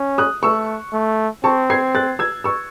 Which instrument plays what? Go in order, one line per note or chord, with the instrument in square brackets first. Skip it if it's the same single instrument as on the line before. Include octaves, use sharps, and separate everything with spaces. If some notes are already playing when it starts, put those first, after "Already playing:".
Already playing: [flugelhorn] C#4
[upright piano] D#6 F#6
[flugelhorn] A3 [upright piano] C#6 E6
[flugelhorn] A3
[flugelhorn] C4 [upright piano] A5 C#6
[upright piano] G#6 C7
F#6 A6
E6 G#6
C#6 E6